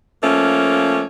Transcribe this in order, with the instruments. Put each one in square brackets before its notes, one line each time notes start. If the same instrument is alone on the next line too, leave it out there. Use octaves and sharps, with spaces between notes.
[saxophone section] F3 A3 A#3 C#4